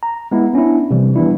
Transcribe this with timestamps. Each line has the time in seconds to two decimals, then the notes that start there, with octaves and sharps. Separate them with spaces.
0.03 A#5
0.32 G#3 B3 E4
0.53 B3 C#4 D4 E4
0.91 C3 E3 G3
1.16 E3 G3 B3 D4 E4